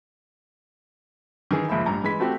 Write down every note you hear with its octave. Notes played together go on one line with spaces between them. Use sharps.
D#3 E3 G#4
F#1 C#2 F3 E5 B5
A1 G2 A#5
E3 G#3 B5 B6
A3 C4 F#4 G4